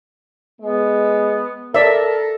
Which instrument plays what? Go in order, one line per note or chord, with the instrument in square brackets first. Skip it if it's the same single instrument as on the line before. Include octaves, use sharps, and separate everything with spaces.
[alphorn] G#3 [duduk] B3
[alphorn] A4 [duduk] A#4 [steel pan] D5 E5